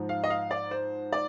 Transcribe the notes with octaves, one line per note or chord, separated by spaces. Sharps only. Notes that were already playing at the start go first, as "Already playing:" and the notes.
Already playing: G#2 F3
F5
D#5
F5
D5
C5
D5